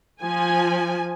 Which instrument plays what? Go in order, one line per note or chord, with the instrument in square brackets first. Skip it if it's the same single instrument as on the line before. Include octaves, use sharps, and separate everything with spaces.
[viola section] F3 G#5